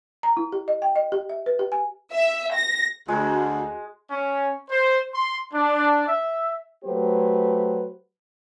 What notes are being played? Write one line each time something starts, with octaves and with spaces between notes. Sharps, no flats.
A#5
E4
G4
D#5
G5
D#5
G4
E5
B4
G4
G#5
E5
A#6
D2 G#3 F#4
C#4
C5
C6
D4
E5
F#3 A3 G4 B4 C5